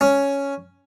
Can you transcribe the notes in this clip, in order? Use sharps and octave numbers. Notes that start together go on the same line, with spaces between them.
C#4